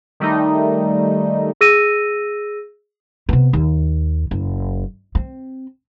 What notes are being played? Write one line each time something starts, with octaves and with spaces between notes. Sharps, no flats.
D#3 G3 A3 D#4
G#4 E6 A#6 D#7
C3 B3
D#2
F#1
C4